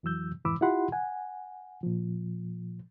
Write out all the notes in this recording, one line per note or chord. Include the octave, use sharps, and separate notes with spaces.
F2 E3 F#3 E6 G6
F2 G#2 E3 B5 D6 E6
E4 F4 G4 F#5 B5 C6
F#5 G#5
A#2 F3